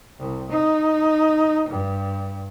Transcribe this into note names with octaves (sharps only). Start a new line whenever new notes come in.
C2
D#4
G2